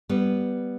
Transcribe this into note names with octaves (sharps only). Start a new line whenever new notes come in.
G3 B3